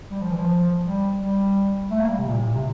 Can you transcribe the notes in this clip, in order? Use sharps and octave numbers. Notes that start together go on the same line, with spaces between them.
G3
F3
E3
F3
G3
G3
A3
A#3
G3
C3
A#2
A2
A#2
C3